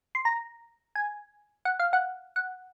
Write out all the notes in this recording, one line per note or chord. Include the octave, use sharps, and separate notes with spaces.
C6
A#5
G#5
F#5
F5
F#5
F#5